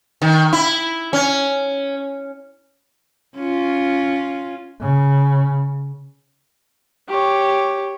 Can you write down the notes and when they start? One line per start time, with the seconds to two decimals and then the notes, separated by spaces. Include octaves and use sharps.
0.22 D#3
0.53 E4
1.13 C#4
3.36 C#4 F4
4.81 C#3
7.09 G4 C#5